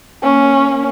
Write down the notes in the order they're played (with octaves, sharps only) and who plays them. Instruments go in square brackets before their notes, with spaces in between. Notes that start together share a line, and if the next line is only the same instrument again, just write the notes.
[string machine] A#3 [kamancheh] C#4